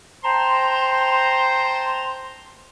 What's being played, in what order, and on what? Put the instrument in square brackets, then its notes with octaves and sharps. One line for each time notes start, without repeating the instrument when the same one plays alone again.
[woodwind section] C5 G5 A5 A#5 C6